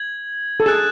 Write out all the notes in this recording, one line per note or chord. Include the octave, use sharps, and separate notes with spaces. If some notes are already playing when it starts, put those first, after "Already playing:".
Already playing: G#6 F#7
A4
G#4 F#6 A6 E7